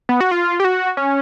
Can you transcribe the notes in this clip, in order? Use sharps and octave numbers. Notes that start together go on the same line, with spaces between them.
B3
F#4
F4
G4
F#4
C#4